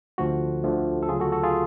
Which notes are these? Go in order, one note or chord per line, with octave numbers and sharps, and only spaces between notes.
D2 D3 F3 A3 F#4
D2 D3 F3 A3
A4
D2 C#3 F#3 F4 G#4
F#4 A4
F#4 A4
F4 G#4